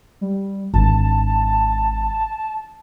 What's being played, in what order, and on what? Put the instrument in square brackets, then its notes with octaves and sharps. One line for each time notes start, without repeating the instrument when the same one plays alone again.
[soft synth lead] G3
[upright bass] G#1 D4 [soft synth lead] A5